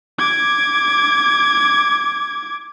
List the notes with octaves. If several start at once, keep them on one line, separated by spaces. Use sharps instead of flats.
D6 G#6